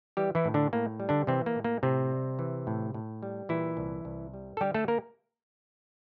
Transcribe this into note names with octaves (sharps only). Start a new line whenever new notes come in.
E3 G3 G4
E3 E4
A2
D3 D4
A2 A#3
G3
D3 D4
C3 E3 C4
A#3
A2
A#3
A2 C3 C4
G3
E3
A2
A2
G3
A#2 E3 E4
C2
C2
G3
A4
D3 G3 G4
A3 A4
A#3 A#4